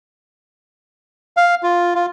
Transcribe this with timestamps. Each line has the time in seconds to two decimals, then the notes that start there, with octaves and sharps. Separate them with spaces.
1.37 F5
1.63 F4
1.95 F4